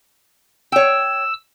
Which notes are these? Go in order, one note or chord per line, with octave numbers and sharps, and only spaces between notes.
C#5 G5 E6